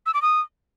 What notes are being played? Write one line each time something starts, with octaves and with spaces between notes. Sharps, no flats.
E6
D6
D#6